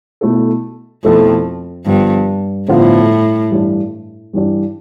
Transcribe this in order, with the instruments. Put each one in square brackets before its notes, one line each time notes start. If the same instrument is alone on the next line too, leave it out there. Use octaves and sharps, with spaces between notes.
[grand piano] B2 A3 E4 A4
[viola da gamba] F2 [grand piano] B2 A3 E4 A4
[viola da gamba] G2 [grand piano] D3 F3 B3 F4
[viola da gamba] A2 [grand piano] D3 F3 B3 F4
[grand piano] G2 E3 G3 D4
G2 E3 G3 D4